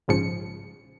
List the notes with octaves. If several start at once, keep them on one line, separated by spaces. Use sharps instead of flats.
A#1 G#2 C#3 F3 C#7